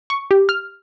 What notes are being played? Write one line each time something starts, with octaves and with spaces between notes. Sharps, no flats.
C#6
G4
F6